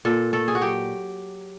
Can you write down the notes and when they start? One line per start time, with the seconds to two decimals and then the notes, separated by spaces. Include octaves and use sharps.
0.05 A#2 A4
0.33 A3 A4
0.48 G#4
0.55 F#4
0.61 F#3 G4